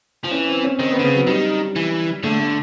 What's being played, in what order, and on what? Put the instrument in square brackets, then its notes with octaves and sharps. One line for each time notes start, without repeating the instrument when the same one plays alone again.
[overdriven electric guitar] F3
[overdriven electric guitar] E3 [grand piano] C#4
[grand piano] C4
C#4
[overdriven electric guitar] D#3 [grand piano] C4
[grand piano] B3
[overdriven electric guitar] D3
[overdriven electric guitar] C#3 [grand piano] B3
[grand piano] F#3
[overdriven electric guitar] D#3 [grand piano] G3
[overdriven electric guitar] E3
[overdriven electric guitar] D3 [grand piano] A3
[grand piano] A3